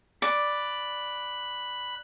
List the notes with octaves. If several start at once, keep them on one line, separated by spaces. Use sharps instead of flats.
D5 B5 F#6